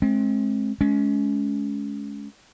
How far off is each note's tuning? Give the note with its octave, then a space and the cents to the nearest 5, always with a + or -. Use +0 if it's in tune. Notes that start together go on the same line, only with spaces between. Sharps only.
G#3 +40 C4 +35
G#3 +30 C#4 +25